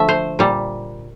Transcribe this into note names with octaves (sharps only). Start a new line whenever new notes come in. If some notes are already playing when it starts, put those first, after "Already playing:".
Already playing: D3 F3 A3 E5
C5
A#2 G3